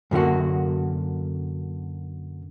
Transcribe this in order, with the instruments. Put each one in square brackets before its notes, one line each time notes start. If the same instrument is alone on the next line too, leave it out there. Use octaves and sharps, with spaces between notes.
[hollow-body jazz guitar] F#2 D3 A#3 F#4